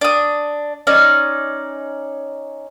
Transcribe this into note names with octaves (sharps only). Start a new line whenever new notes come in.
D4 D#6
C#4 D#4 D5